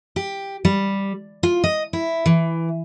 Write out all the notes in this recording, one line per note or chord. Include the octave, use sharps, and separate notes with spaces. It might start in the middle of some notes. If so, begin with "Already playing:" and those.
G4
G3
F4
D#5
E4
E3